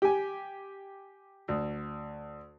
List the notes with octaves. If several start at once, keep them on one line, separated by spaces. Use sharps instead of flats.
G4 G#5
D2